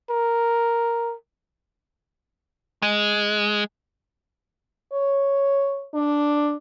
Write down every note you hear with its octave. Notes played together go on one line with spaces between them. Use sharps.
A#4
G#3
C#5
D4